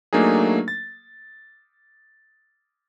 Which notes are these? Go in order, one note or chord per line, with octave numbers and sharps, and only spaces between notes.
F#3 A3 A#3 D4 D#4 G#4
A6